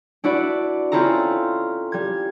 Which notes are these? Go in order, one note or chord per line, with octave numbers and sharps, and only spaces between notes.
D4 E4 F#4 B4 D5
C4 C#4 E4 F4 A4 A#5
G3 G#6